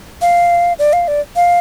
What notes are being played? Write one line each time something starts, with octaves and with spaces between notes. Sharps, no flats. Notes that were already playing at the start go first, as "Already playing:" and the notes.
F5
D5
F5
D5
F5